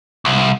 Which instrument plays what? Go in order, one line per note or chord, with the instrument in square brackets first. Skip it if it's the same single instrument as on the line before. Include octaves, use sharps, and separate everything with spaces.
[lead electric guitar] C2